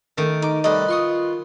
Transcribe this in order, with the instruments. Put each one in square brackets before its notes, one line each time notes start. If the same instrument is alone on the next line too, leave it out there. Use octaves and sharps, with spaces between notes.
[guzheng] D#3 [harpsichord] A3
[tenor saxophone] D#4 [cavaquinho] D6
[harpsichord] C3 G3 A3 [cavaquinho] B4 D#5
[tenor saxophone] F4 [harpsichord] C6 C#6 D#6